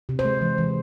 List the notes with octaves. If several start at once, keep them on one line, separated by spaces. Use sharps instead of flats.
C3
C5
G#3
E3
E3